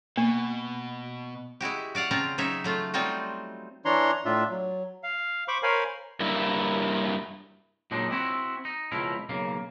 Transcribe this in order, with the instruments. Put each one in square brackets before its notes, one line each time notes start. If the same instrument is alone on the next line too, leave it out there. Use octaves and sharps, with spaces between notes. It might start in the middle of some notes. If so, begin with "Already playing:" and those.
[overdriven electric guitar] B2 [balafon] A#3
[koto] G#3 E4 F#4 G4
F#4 D5 F5 F#5
C#3 C4 F4 A5 A#5
C#3 F#3 D#4 C#5 E5
F#3 A3 F4
F#3 G3 C4 D#4 F4 F#4
[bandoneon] E3 D4 C#5 A#5 C6
A2 D4 F4 E5
F#3
F5
C5 B5 C#6 D6
A#4 C5 C#5 F5 G#5 B5
[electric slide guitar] G2 A#3 E4
[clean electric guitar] A#2 F#3 G#3 D4 D#4
C4 E4 F#4
D#4
C#2 B2 F3 E4 A#4
B1 C#3 A#3